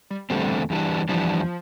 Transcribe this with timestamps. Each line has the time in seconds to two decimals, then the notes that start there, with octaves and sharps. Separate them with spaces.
0.10 G3
0.30 E2 D3 G3 A3 C4
0.70 E2 E3 G3 D4
1.09 E2 E3 F3 G3 D4